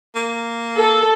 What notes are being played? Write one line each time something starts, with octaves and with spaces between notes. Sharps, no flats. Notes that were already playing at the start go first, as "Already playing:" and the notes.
A#3
A4